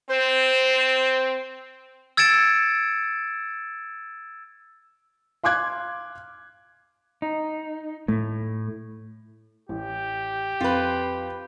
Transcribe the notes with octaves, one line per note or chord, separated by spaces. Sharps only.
C4 C5
E6 G#6 A6 C#7 D7 E7
F5 C6 D6 F#6 G#6
D#4
A2 A3
A1 G4
F2 F4 B4